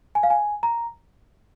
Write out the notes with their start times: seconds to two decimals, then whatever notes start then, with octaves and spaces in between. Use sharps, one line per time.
0.15 G#5
0.23 F5
0.30 G#5
0.63 A#5